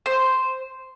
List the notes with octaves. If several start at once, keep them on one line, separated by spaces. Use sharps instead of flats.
C5